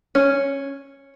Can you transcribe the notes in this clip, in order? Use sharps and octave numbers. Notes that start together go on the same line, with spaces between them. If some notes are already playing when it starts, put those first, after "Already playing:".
C#4